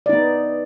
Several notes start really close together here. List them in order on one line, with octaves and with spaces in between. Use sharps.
D5 D#4 B3